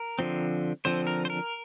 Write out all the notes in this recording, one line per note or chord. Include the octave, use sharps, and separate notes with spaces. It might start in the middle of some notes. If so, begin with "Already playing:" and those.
Already playing: A#4
D3 F3 C4
D3 F3 C4 C5
A#4
C5
A#4